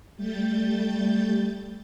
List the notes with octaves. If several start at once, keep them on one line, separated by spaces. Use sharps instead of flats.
G3 A3 G6 A6